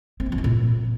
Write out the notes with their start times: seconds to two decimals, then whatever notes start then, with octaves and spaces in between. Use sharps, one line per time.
0.20 C4
0.26 D#3
0.32 F3
0.38 E3
0.44 A#2